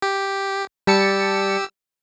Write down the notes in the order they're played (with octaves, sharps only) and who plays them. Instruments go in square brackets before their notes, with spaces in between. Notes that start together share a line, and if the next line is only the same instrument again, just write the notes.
[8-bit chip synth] G4
[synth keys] G3 A5 C#7 [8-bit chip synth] G4 E6